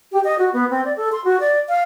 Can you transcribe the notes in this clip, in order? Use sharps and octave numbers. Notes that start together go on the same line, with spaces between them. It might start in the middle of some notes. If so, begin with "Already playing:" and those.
G4
D#5
F#4
B3
C4
D5
A4
C6
F#4
D5
F5